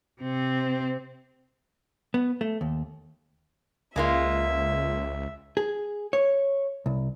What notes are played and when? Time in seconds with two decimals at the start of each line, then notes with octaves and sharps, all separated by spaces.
0.20 C3 C4
2.14 B3
2.41 A3
2.61 D#2
3.96 C#2 G#3 A#3 F4 E5
5.57 G#4
6.13 C#5
6.86 C2